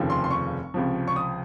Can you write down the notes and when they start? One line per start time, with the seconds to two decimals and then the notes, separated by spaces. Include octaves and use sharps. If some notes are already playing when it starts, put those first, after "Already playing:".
Already playing: F1 D#2 C#3 F3
0.10 C6
0.24 C6
0.31 C#6
0.74 C#2 C3 F3
1.08 C#6
1.16 D#6